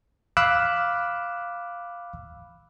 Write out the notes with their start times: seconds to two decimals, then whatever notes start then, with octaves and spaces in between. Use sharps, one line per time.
0.37 F5 B5 D6 E6 F#6